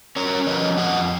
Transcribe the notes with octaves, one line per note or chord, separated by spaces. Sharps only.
C#4 A#4 C#5
F3 B4 D#5
F2 D#5 F#5